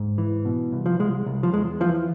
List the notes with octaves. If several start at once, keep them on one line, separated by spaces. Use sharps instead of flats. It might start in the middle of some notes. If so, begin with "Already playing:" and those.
Already playing: G#2
E3
B2
C2
F3
C2 G#3
C2
F3
E2 G#3
E3 F3